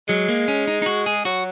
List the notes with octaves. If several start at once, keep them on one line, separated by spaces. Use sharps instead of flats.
F#3 G#3
A#3
C#4
D#4
D#4
F#4
G#4
F#3 F#4